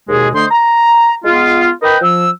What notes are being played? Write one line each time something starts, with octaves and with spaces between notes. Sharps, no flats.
D#2 B2 G#3 G#4
D3 A3 C5 D#5 C6
A#5
G#3 B3 F4
A#4 B4 D#5 G5 B5
F3 E6